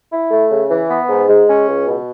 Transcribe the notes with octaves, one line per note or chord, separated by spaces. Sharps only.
E4
A3
C#3
E3
B3
G#2
G#3
C#4
C#2
B2